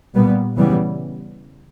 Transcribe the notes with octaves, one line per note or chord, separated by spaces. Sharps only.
A#2 G3 B3
C#3 E3 G3 B3